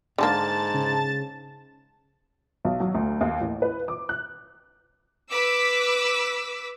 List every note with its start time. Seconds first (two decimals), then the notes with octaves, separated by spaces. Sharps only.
0.18 G#2 D3 G#3 A#3 A5 A6
0.74 C#3
2.65 B1
2.80 F#3
2.95 D2
3.21 D#2
3.41 A1
3.62 B4
3.88 D6
4.09 F#6
5.32 B4 D6 E6 B6